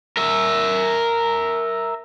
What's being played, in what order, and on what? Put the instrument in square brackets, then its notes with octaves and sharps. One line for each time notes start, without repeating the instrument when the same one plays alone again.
[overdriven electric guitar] A#4 E5